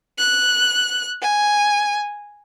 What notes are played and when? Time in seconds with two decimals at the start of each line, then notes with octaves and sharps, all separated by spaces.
0.19 F#6
1.22 G#5